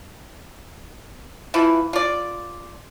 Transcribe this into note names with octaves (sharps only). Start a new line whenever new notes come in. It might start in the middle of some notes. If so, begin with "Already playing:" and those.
E3 F3 E4
F4 D5